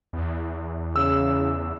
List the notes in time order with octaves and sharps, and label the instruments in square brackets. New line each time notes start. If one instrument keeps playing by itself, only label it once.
[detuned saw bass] E2
[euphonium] C#3 [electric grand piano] E6